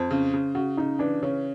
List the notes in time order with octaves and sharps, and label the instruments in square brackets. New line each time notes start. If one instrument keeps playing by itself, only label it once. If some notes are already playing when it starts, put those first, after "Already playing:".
Already playing: [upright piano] F2 [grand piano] C5
[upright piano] C#3
C#3
[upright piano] C#3 [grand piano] F#4
[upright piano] C#3 [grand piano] D#4
[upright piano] E3 [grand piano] D4
[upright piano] C#3 [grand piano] C#4